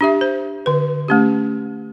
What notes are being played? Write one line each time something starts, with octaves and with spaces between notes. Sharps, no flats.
D4 G4 E5
C5
D3 B4
A3 C#4 G4